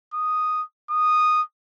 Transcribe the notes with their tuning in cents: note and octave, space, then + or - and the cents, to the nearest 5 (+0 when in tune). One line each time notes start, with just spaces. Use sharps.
D#6 +0
D#6 -10